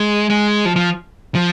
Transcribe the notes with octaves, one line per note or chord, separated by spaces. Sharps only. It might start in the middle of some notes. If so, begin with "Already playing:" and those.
Already playing: G#3
G#3
F3
F3
F3